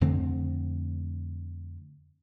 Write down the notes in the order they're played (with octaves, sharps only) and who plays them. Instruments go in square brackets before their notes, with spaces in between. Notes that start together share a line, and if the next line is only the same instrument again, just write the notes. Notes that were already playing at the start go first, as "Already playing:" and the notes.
[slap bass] F2 D3 A3 C4